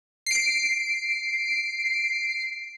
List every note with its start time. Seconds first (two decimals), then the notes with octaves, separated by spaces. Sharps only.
0.26 C7 D7